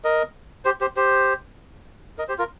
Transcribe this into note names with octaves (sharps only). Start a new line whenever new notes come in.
A#4 D#5
G4 C5
G4 C5
G4 C5
A#4 D#5
G4 C5
F4 A#4